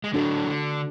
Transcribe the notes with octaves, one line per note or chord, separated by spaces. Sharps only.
G#3
D3 F#3 A3 D4 F#4 A4
D3